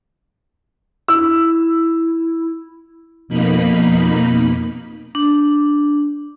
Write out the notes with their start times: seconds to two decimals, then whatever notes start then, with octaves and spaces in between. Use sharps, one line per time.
1.08 E4 E6
3.28 F2 B2 A#3 D#4 B5
5.15 D4